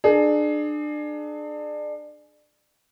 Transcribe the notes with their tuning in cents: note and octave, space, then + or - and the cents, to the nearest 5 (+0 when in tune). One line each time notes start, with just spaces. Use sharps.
D4 +30 G#4 +25